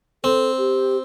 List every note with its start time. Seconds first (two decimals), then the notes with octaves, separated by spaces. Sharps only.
0.24 C4 A4
0.58 G4